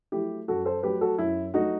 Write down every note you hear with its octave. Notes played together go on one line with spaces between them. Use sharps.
F#3 A3 E4 G4
F#2 F#4 A4
A4 C5
F#3 A3 G4 B4
F#4 A4
F#2 E4
F#3 A3 D#4 F#4